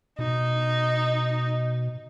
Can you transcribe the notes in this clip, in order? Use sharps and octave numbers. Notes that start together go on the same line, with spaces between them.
B2 D#4